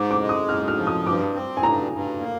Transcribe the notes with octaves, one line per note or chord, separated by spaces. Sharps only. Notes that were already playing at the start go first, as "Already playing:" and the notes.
Already playing: G#2 D6
D6
G#3
D#6
G#2 F6
F6
F3
D#6
G2 D6
C4
G#5
G2 A#5
G2
A#3